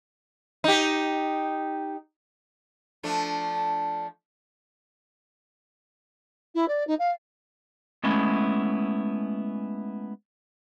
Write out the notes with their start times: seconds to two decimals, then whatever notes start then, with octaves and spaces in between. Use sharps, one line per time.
0.64 D#4 G4
3.03 F3 A3 D4
6.54 E4
6.68 D5
6.87 D#4
6.99 F5
8.04 G#3 A3 B3 C#4 E4